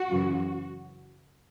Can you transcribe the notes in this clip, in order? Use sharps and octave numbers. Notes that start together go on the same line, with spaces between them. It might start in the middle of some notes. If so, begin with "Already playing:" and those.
Already playing: F#4
F#2 C#3 E3